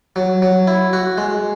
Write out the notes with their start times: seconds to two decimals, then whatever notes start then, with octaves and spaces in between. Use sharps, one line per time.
0.16 F#3
0.42 F#3
0.67 E4
0.93 F#4
1.18 G#3